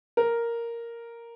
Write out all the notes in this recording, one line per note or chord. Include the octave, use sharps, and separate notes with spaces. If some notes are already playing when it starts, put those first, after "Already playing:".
A#4